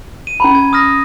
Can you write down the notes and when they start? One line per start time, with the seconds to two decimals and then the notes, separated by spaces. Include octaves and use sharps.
0.27 D#7
0.40 C#4 A#5 B5
0.55 G#6
0.73 D#6 F6 A#6